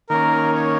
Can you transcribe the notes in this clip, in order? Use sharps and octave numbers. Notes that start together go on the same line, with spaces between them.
D#3 A#3 C#4 A#4
C#5